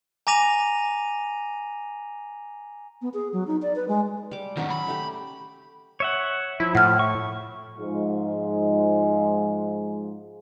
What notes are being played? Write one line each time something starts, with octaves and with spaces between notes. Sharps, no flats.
G#5 A#5 D6 A#6 D#7 F7
B3
G#4
F#3
D#4
D5
B4
G#3
G3 D6
A2 D#3 F#3 C#4 F#4
B5
A3 G4
C#5 E5 F#5
F3 E4
A2 F#5 F6
C#6
G#2 F3 G#3